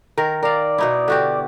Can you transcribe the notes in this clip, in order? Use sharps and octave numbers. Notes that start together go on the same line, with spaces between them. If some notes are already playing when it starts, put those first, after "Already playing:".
D#3 A#4
A#4 D5 F5
B2 D#4 E4
D3 F#4 G4